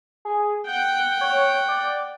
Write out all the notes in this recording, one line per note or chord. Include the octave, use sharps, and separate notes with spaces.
G#4
F#5 G5 G6
C#5
D5